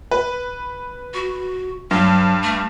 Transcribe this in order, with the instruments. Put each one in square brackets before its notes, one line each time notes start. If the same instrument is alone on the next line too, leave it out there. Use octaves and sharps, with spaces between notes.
[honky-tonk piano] B4
[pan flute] F#4
[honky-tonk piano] G2 [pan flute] F#3
[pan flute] A3